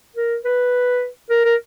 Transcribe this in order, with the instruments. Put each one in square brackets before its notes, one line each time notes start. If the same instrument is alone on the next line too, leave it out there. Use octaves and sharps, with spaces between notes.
[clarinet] A#4
B4
A#4
A#4